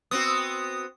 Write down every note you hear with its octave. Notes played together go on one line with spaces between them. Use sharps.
B3 C4 F#4 D#6